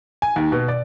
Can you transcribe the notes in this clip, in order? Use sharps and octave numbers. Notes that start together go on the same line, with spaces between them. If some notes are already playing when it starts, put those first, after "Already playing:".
G#5
D#2
B2
D5